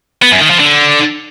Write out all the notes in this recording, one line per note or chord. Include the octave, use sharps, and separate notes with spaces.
B3
F#2
D#3
F3
D3